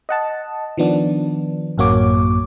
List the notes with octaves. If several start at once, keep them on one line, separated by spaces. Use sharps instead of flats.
D#5 F#5 A5
D#3 F3 B3 D4
A1 F#2 A#3 F#4 C#5 D6